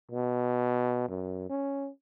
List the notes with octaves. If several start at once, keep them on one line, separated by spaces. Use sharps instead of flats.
B2
F#2
C#4